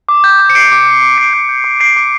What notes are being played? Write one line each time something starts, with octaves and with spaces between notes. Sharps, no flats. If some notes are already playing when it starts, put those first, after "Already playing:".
D6
G6
D6
C#7
G6 C7 D7
D6
G6
D6
D6 C7 D7
G6
G6
D6
G6 C7 D7
D6